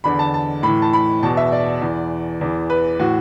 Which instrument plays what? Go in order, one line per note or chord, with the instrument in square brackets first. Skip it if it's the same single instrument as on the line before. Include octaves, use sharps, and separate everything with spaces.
[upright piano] E2 D3 B5
A5
A5
A2 B5
E3
A5
B5
E2 B2 A5
E5
D5
E2 E3
E2 E3
B4
A2 E3 F#4